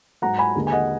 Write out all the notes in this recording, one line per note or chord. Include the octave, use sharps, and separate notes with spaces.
G#2 F#3 F#5 A#5
G#5 B5
D#2 D3 G#3
G#5
D#5 F#5